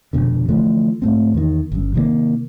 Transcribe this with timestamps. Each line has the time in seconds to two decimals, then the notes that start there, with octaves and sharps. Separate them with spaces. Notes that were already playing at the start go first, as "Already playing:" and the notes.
0.13 F1 B1 B2 D3
0.49 D3 E3 F3 A3
1.02 G#2 A3 C4
1.34 E2 D#3
1.72 G1 F#2
1.94 C3 D#3 G#3 A#3